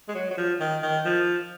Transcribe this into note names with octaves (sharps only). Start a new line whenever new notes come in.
G#3
F#3
F#3
F3
D#3
D#3
F3